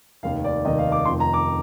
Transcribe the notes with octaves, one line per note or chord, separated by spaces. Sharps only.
F1 D#2 D#3 F5
D5
F1 D#2 D#3 D#5
F5
D6
F1 F2 D#3 C6
A#5
D6